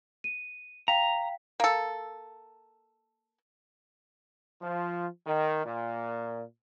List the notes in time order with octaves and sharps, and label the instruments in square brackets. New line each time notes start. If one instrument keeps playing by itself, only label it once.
[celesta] D#7
[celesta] F5 G5 B6 [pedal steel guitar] A#5
[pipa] A#3 A4
[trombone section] F3
D#3
A#2